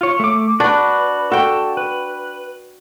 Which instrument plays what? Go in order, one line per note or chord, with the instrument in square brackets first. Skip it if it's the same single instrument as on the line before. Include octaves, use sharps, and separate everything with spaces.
[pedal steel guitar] F4 C#5
A3 D6
[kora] D4 [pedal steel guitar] F#4 B4
[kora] F#4 G5 [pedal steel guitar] A4
[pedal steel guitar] B4